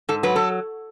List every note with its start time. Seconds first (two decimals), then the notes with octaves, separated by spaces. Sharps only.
0.09 G#2 A4
0.23 F#3 B4
0.36 A4